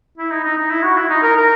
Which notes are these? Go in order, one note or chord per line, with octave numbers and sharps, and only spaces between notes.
E4
D#4
D#4
D#4
E4
F#4
E4
D#4
A#4
A#4